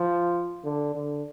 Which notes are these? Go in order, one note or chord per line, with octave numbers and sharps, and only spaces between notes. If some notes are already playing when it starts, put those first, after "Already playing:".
Already playing: F3
D3
D3